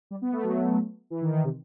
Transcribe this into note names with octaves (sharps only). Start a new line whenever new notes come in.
G3
B3
A3
F#3
E3
D#3
D#3
C3